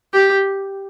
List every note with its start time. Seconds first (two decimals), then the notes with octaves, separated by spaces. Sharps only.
0.13 G4